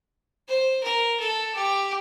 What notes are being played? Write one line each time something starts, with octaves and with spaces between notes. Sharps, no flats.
C5
A#4
A4
G4